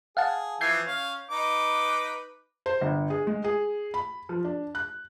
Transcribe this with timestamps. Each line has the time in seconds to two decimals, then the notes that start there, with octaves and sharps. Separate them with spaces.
0.17 G#4 F5 F#5 A5
0.61 E3 F3 E5 G6 G#6 C7
0.86 C#4 F5
1.30 D#4 B4 D6
2.66 C5
2.81 G1
3.10 G#4
3.27 G#3
3.44 G#4
3.94 B5
4.29 F3
4.44 D4
4.75 F#6